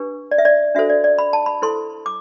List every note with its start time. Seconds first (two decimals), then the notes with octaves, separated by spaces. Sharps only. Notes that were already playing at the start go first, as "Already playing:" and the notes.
Already playing: D4 G4 B4
0.31 D5
0.38 E5
0.45 D5
0.75 D4 F#4 A4 C5 E5
0.90 D5
1.04 D5
1.18 B5
1.33 A5
1.46 B5
1.62 E4 A4 C5 C6
2.06 D6